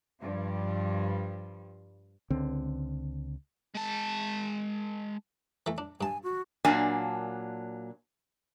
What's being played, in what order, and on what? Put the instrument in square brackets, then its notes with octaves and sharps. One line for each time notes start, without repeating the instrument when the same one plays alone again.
[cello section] G2 F3 G3
[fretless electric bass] C#2 D3 C4
[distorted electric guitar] G#3 A5
[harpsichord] E3 A3
D4
[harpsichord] G2 A5 [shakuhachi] G#5
[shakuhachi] F#4
[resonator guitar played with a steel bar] A#2 F#3 A#3 D4 G#5 A5